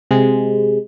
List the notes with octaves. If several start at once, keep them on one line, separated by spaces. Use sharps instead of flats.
C3 G#3